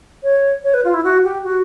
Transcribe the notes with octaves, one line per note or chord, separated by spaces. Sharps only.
C#5
C#5
B4
F4
E4
F#4
G4
F#4